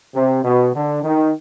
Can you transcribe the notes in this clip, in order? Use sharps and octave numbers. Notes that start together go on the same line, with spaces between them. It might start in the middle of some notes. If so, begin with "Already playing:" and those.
C3
B2
D3
D#3